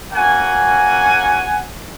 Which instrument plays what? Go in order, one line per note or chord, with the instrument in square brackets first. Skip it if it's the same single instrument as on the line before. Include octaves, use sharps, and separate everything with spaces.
[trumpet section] A#3 C#4 F#4 F#5 G#5